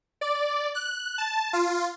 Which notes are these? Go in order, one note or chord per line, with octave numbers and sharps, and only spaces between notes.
D5
F#6
A5
F4